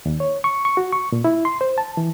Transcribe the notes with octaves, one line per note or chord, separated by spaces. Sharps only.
D#2
C#5
C#6
C#6
F#4
C#6
A#2
E4
C6
C5
A5
E3